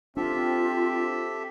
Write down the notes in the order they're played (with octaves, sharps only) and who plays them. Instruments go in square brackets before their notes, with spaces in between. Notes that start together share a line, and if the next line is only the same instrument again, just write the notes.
[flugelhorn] C4 [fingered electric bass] D4 [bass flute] F4 [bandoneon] G4 A4 E5